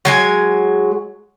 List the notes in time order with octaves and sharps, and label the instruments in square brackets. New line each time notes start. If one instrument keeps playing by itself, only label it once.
[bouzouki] F#3 G#3 G#5